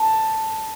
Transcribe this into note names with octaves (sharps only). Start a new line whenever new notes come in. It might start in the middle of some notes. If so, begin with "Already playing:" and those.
Already playing: A5